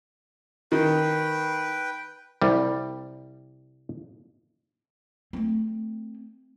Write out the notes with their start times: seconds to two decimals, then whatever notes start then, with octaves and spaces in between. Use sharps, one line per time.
0.72 D#3 B4 G5
2.42 C2 G3
5.33 A3 C4